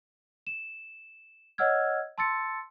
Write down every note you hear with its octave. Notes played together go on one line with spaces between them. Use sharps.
E7
C#5 D#5 F#5 E6 F6 G#6
A5 C6 E6 A6 C#7